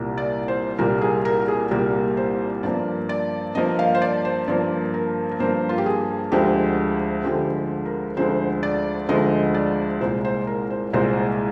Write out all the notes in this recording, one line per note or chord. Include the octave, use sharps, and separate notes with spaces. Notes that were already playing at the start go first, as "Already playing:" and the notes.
Already playing: C2 A#2 G3 A#3
D5
C5
C2 A#2 G3 A#3 A#4
G#4
A#4
G#4
C2 A#2 G3 A#3 A#4
C5
G2 F3 A#3 D5
D5
G2 F3 A#3 D#5
F5
C5
D5
C5
G2 F3 A#3 D5
A#4
A#4
G2 F3 A#3 C5
F4
G4
G#4
D2 D3 F3 G#3 G4
D2 D3 F3 G#3 G4
A#4
D2 D3 F3 G#3 C5
D5
D2 D3 F3 G#3 D#5
D5
C2 A#2 G#3 C5
C5
A#4
C5
C2 A#2 G#3 C5